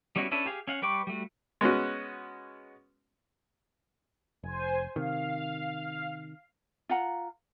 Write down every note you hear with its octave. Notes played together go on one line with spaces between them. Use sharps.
G3 B3 C#4 E4 F#4
C#4 D4 E4 A4 B4
G4 G#4 F5
C#4 F5 F#5
G3 B4 G5 C#6 D6
G3 A3 F#4
G#3 B3 C#4 F#4
F1 C5 G#5
C3 D#3 F5
F4 F5 F#5 A#5